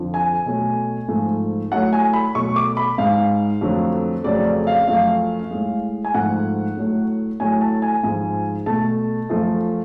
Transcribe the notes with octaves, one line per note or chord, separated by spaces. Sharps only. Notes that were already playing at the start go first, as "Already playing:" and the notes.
Already playing: F2 D3 F3
G#5
B2 F#3 A3
G#2 F3 A3
A2 F#3 A3 F#5
G#5
B5
B2 F#3 A3 C#6
D6
B5
G#2 G#3 F5
F2 D3 F#3 A3
F2 C#3 F#3 A3 D5
D5
F5
F#2 F3 A3 F5
A2 G#3
G#5
G#2 F3 A3 F#5
A2 F#3 A3
A2 F#3 A3 G#5
A5
G#5
G#2 F3 G#3
B2 A3 A5
F#2 F3 A3